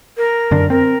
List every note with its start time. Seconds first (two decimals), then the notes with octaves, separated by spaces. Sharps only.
0.17 A#4
0.51 F#2 D3 D4
0.70 C4 A#4